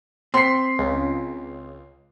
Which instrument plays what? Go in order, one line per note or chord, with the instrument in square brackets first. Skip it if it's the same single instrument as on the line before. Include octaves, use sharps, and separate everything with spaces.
[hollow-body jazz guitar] C4 [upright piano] C6 B6 C7
[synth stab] C#2